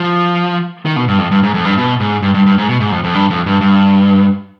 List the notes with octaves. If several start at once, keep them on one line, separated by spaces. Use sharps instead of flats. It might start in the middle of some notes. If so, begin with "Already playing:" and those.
Already playing: F3
D#3
B2
G2
F2
G2
G#2
F2
G2
B2
G#2
G2
G2
G2
G#2
B2
G#2
F2
F2
G2
F2
G2
G2